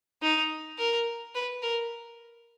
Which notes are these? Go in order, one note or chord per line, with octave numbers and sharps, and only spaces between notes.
D#4
A#4
B4
A#4